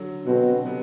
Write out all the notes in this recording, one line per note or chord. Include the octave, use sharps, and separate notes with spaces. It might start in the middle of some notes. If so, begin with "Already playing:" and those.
Already playing: D3 F#3
B2 D3 F#3 C4 F#4
C3 F#3 B3